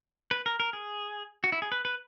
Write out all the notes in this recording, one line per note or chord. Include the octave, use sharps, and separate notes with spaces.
B4
A#4
A#4
G#4
F#4
E4
G#4
B4
B4